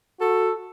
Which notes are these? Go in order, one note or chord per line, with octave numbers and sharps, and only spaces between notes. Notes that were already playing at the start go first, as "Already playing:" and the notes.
F#4 A4